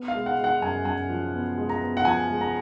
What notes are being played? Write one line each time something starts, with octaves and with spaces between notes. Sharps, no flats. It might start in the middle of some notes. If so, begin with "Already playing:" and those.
Already playing: B3
F5
G#3
F#5
G#3
F#5
F#2 G#5
F#2 G#5
F3
B3
G#3
A#5
B3
F#5
F3 G#5
G#3
A#5